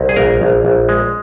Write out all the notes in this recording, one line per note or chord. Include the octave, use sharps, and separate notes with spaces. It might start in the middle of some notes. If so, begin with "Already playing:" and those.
Already playing: C2
G#4
A#1 A#4
A#1
A#1
G#3